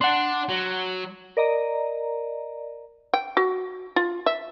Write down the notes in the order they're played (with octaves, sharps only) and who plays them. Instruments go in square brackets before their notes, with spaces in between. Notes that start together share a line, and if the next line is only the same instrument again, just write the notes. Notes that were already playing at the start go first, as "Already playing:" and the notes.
[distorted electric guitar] D4 [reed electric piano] F#5 C6
[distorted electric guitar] F#3
[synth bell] A#4 D5 D#5 A#5
[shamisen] G5
F#4
F4
E5